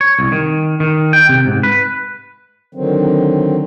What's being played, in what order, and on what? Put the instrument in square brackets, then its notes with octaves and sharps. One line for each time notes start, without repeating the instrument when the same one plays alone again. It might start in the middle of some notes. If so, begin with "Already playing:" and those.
[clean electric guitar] C#5
C2
D#3
D#3
G5
C3
G#2
B4
[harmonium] D3 D#3 F#3 C4